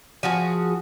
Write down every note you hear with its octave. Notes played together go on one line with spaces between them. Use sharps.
F3 F#4 G#4